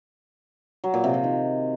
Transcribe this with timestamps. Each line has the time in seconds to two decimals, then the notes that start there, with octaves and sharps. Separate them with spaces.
0.84 F#3
0.94 A#2
1.04 C3
1.14 F3
1.24 D#3